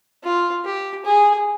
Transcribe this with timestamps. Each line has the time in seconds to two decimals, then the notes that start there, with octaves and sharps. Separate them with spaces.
0.23 F4
0.65 G4
1.05 G#4